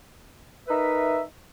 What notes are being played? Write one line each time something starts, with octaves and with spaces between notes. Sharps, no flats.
D#4 A#4 B4 E5